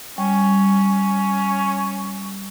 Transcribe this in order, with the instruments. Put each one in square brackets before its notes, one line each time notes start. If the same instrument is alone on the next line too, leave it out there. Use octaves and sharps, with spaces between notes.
[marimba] G3 [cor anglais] C#4